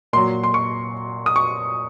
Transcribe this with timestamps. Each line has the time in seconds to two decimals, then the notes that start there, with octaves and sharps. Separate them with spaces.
0.13 A#2 F#3 C6
0.44 C6
0.54 C#6
1.26 D#6
1.36 C#6